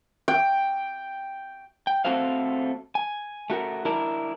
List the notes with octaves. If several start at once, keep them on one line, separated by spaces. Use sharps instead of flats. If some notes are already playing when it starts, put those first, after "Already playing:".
G5
G5
A3 C4 F#4 A4 C5 F5
G#5
A3 F#4 A#4
D4 E4 A#4